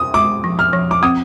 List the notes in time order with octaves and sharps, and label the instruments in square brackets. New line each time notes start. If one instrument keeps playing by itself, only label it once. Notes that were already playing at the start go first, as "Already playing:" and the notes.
Already playing: [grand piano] D#6
[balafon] G#3 [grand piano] D6
[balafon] F3
[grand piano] F6
[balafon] F3
[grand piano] D6
[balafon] C4 [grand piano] D#6